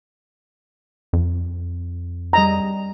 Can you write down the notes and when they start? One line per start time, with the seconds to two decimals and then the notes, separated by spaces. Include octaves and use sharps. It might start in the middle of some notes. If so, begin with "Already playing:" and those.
1.13 F2
2.33 G3 D#5 A#5